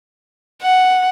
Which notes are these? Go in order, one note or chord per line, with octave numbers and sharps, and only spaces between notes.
F#5